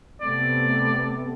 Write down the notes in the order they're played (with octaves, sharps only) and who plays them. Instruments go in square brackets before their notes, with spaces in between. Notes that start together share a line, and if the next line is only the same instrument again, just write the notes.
[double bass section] C3 A3 B3 [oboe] D5